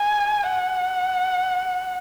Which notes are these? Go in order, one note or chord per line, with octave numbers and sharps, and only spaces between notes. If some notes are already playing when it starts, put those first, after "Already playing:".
Already playing: G#5
F#5